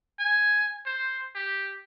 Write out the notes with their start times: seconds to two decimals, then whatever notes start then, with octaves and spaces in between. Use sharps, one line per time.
0.19 G#5
0.86 C5
1.35 G4